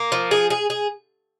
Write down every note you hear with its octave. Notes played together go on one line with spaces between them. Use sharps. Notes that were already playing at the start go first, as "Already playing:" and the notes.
Already playing: A#3
F3
G#4
G#4
G#4